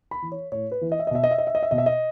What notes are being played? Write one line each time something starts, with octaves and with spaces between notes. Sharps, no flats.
B5
E3
C#5
A2 C#5
B4
E3
D#5
E5
D#5
B2 E5
D#5
E5
D#5
E5
D#5
E5
B2 D#5
E5
D#5